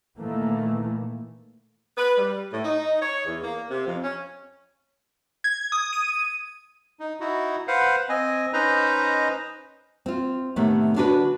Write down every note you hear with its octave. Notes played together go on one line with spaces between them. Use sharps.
A#2 D#3 E3 A3 A#3
B4
G3
A2
D#4
C#5
E2
A#3
C3
F2
C#4
G#6
D#6
D#7
D#4
D#4 E4 F#4
B4 C5 F5 F#5
C4 D#5 G#5
C#4 D#4 B4 C5 D#5 A#5
C4 F4
A2 C3 D#3 A3 B3
D3 D4 F#4 G#4 B4